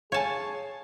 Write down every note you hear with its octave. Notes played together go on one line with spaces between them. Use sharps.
G#4 C#5 F5 G#5 A5